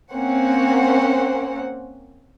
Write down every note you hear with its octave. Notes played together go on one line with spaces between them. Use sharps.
A#3 C4 C#4 F#5